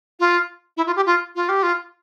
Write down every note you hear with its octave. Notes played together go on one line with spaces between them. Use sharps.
F4
E4
F4
G4
F4
F4
G4
F4